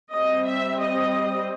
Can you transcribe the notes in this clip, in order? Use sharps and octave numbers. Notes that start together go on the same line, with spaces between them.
G3 C4 D#5
E5
D#5